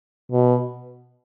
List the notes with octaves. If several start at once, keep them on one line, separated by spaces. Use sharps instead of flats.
B2